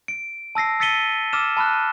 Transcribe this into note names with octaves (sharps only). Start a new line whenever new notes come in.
D7
A5 E6 A#6 C7
E6 A6 B6 C#7 D#7 G7
D6 E6 F6 A6 E7
A5 B5 F6 F#6